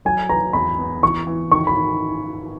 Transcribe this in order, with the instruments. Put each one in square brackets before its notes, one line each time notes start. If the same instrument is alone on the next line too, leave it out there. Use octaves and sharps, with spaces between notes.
[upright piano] F#3 [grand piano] G#5
[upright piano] B4 [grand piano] A#5
[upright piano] E2 [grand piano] B5
[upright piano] B3
[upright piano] E3 [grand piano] C#6
[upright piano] E3
[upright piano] D#3 [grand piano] C#6
[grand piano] B5
[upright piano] D#3